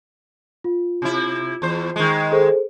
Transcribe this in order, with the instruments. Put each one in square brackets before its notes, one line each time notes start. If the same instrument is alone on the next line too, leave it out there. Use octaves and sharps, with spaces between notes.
[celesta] F4
[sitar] C3 E4
E2 C5
D#3 G#3
[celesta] G#4 A4 C5